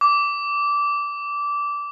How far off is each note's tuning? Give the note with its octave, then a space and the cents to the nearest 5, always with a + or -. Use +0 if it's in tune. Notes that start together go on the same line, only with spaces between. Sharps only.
D6 -15